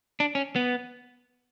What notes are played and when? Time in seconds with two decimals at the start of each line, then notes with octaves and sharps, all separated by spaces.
0.20 D4
0.35 C#4
0.56 B3